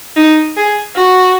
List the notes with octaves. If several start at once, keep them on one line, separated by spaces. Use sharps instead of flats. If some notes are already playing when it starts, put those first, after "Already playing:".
D#4
G#4
F#4